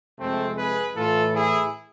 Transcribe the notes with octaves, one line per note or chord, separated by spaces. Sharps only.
F2 C3 G#3 A3 C4
G#4 B4
A2 E3 A3 F4 A4
E4 G#4